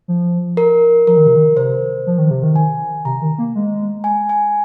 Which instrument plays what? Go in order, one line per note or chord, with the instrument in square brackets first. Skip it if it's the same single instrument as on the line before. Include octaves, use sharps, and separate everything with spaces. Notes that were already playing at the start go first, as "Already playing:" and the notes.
[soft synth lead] F3
[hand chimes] A#4
[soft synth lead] F3 [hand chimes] A#4
[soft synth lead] D#3
C3
D#3
[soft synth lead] C3 [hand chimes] C5
[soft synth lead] F3
D#3
C3
D#3
[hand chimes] G#5
[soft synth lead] C3 [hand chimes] A#5
[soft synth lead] D#3
A#3
G#3
[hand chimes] G#5
G#5